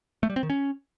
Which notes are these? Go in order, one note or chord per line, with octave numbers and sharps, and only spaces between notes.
A3
G3
C4
D#3
C#4